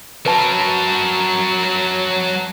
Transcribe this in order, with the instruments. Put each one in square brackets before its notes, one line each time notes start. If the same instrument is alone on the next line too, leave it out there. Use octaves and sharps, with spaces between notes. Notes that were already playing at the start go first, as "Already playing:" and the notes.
[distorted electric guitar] F#3 A#4 [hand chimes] B4 A5